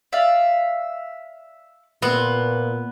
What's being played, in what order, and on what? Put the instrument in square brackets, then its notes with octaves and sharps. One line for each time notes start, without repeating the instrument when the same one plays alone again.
[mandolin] D5 E5 F5
[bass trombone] A#2 [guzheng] B3 [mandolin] C4